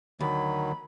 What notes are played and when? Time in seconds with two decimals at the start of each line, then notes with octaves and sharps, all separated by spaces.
0.21 D2 D#3 F#3 B5